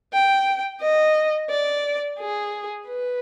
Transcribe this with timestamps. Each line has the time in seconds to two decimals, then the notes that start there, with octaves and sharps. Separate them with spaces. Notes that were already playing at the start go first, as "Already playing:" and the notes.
0.13 G5
0.81 D#5
1.50 D5
2.19 G#4
2.88 B4